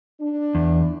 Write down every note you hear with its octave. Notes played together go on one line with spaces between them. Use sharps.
D4
E2